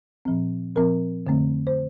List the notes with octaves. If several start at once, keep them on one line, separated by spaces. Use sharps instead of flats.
A#2 F3 C4
A#2 F3 C4 A#4
F2 D3 A3 C4
C5